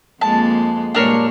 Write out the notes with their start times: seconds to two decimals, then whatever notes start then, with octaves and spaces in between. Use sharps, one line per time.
0.21 F2 G#3 A#3 A5
0.95 G2 A#2 G#3 D4 A#4 C#5